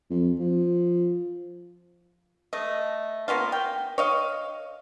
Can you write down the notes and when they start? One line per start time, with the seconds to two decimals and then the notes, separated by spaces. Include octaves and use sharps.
0.10 F2
0.39 F3
2.53 A3 D#5
3.28 A#3 B3 C#4 F4
3.52 G5
3.98 C#5 D#5 F5